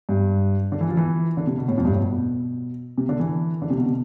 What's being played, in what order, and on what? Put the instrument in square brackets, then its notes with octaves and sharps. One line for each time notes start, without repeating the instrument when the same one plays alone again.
[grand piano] G2
D3
E3
F3
E3
D3
C3
B2
A2
F2
G2
A2
B2
C3
D3
E3
D3
C3
B2
C3